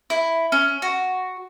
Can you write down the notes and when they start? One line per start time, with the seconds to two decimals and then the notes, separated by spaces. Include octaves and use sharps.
0.10 E4
0.52 C#4
0.82 F#4